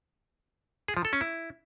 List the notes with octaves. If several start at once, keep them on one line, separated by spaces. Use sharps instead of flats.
G#4
F3
A4
C#4
E4